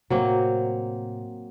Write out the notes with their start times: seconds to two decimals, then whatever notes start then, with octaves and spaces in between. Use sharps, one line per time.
0.10 A2 C3 F#3 A#3 C4